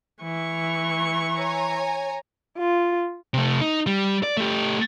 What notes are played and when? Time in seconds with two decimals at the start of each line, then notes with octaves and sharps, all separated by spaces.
0.23 E3 C#6
1.35 C#5 G#5 A#5
2.58 F4
3.34 C3 A3
3.61 D#4
3.87 G3
4.23 D5
4.37 A3 G4